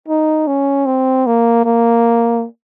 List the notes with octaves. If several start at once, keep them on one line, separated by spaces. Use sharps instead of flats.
D#4
C#4
C4
A#3
A#3